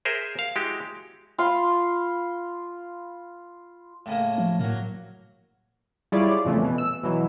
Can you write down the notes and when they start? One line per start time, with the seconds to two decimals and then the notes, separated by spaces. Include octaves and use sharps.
0.05 G#4 A#4 C5 E5
0.39 F5
0.56 G#3 E4 F#4 G4
1.38 F4 F5 B5 C6
4.06 A2 C#3 A#3
4.38 F3
4.59 A2 F#3 A#3
6.12 G3 E4 F4 G#4 C#5 D5
6.45 F2 A#2 C#3 E3 A3
6.62 B2 E3
6.78 E6
7.03 B2 E3 F#3